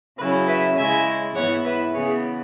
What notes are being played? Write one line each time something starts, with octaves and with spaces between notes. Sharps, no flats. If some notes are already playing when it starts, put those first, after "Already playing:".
C#3 F#3 C#4 E4 B4
B4 E5
C#3 G#3 C#4 E4 E5 G#5
G#2 E3 B3 E4 C#5 F#5
B4 E5
C#3 E3 B3 G#4 C#5